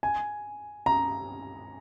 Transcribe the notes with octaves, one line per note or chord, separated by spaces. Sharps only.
G#5
A#5